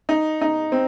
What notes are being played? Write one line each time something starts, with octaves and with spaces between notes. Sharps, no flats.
D#4
D#4
C4